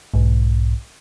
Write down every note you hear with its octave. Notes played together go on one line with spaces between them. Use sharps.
B1 G#2